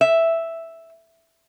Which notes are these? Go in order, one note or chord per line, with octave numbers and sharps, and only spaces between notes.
E5